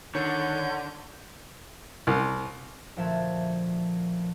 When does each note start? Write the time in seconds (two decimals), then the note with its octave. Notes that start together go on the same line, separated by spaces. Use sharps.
0.15 D3 D#3 C#5 G6
2.07 C2
2.97 D2 A#2 F3 E5 A5 G#6